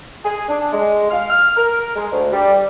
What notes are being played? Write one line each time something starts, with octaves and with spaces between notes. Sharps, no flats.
G#4
D4
G#3
F5
F6
A#4
G#3
D2
G3